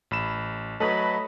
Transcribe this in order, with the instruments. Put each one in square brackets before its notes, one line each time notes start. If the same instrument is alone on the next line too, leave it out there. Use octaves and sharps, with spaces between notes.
[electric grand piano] A1 B5 E7
[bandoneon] F#3 D#5 [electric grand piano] A3 [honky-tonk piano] A4 B4 C#5 [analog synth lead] B5